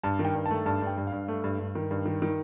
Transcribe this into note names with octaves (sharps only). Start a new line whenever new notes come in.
G2 A5
D#3
G5
G2
A5
A3
G2 A5
G2
G5
G2
F5
G2
A3
G2
G2
D#3
G2
D#3
D#3